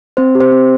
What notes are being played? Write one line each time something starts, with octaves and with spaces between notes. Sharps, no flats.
C4 C5
G4
C5
C4